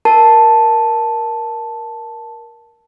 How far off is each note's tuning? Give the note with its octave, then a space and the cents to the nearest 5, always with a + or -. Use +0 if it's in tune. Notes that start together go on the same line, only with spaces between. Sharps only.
A#4 +15 A5 +0